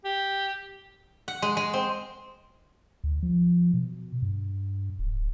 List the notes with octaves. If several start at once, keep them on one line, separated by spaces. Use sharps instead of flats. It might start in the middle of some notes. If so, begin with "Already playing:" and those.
G4
F#5
G#3
G#3
C4
D2
F3
B2
G2
D1